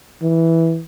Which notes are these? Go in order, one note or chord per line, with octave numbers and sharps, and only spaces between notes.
E3